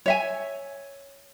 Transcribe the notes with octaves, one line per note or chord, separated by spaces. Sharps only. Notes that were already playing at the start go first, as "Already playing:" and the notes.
C#5 E5 G#5